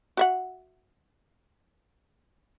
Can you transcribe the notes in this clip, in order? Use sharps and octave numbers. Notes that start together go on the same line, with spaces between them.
F#4 E5 F#5